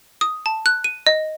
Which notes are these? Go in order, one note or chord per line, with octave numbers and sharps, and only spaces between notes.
D#6
A5
F#6
D#7
D#5